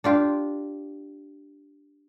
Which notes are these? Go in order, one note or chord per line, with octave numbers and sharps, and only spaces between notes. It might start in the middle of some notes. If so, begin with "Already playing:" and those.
D4 F4 G4